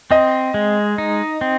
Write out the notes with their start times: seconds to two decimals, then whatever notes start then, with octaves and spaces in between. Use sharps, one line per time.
0.11 C4 D#5
0.54 G#3
0.98 D#4
1.41 C4